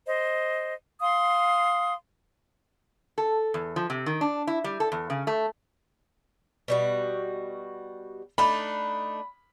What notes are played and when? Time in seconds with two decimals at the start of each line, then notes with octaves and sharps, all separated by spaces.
0.08 C5 D#5
1.01 F5 C6 D#6
3.18 A4
3.54 E2
3.76 F3
3.90 C3
4.06 D#3
4.21 D4
4.47 E4
4.64 G3
4.80 A4
4.92 E2
5.10 C#3
5.27 A3
6.68 B2 G3 F#4
8.38 A3 D4 D#4 B5